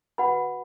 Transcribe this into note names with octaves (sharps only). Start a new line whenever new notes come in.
F#4 B4 F#5 B5